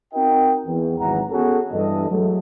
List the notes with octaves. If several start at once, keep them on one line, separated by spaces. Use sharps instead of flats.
C4 D#4 F#4 A#4 D#5 G5
E2
G#1 E2 E3 F#3 F#5 A#5
B3 C#4 F#4 G#4 A4
G2 E3 A4 D#5
F#3 G#3 A3